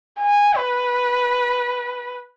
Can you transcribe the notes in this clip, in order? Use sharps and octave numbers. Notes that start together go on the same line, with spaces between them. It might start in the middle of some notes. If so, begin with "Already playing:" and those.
G#5
B4